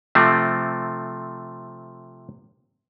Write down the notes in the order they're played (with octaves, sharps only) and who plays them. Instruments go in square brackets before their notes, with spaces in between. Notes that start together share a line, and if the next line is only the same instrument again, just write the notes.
[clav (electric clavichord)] C3 F3 A3 C4